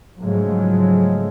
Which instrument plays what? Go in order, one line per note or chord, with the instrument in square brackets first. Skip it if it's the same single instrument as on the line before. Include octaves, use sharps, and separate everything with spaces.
[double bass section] G#2 C#3 F3 F#3 G#3 A3